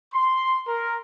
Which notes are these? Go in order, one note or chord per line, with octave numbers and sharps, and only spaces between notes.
C6
A#4